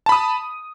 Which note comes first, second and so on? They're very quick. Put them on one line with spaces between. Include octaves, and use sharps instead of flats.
A5 B5 D#6